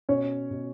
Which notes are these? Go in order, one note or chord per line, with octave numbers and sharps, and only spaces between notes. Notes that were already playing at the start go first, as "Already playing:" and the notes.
B2 C#4 C#5
B2